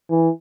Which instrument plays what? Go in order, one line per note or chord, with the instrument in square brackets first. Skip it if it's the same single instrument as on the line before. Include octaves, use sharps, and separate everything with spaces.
[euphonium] E3